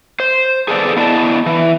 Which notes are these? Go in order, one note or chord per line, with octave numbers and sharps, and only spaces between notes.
C5
G#4 A4 B4 D5
B3 E4 D5 D#5 G#5 A5
E3